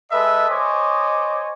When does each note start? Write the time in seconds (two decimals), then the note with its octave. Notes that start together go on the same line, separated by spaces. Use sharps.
0.11 G#3 A4 B4 D#5 E5
0.49 C5 C#5 D#5 G#5 D6